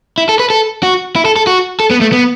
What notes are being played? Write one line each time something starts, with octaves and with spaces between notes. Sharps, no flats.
E4
A4
B4
A4
F#4
E4
A4
A4
F#4
A4
B3
A3
B3